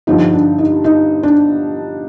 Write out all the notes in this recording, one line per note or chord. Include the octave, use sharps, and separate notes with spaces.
G2 D3 F3 D#4
D4
D#4
D#4
D4